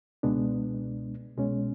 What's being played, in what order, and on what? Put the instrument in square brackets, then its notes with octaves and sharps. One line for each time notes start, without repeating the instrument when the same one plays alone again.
[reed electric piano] C#2 B2 G#3 B3 D4
C2 B2 G#3 C#4